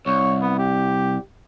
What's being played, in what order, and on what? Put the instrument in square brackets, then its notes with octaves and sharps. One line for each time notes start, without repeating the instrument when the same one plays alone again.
[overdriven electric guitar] C2 [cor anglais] C#5
[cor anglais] B3
G4